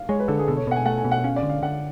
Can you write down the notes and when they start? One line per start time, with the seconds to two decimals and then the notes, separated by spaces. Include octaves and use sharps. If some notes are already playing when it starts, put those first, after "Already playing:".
Already playing: F5
0.09 G#3 C#5
0.19 B4
0.28 D3 A4
0.39 G#4
0.48 B2 A4
0.57 C#5
0.67 B2 F#5
0.76 G#5
0.86 A3 F#5
0.98 G#5
1.05 B2
1.11 F#5
1.24 C#4 F5
1.36 D5
1.43 D3
1.49 F5
1.62 D3 F#5